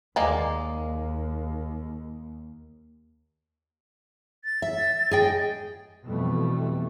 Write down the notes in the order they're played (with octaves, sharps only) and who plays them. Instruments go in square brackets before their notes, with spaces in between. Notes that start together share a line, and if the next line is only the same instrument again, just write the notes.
[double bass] D#2 [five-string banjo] G#3 A#3 D5
[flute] A6
[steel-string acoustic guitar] E5
G#4 D#5 G5
[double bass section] F2 B2 E3 G3 A3